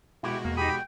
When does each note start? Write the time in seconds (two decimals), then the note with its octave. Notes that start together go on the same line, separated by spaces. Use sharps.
0.23 B2 G#3 E4 F#4 G4
0.45 E2 A#3
0.57 D#4 G4 G#4 B5
0.69 G5